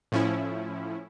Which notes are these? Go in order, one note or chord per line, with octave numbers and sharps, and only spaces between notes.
A2 F3 C#4 E4